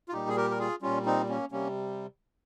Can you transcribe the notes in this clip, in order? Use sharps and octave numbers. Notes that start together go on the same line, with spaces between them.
F4
A#2 G3 D#4 G4
G#4
G4 A#4
A#4
F4 G#4
A#2 G3 C#4 F4
C4 D#4
A#3 C#4
C3 G3 A#3 C#4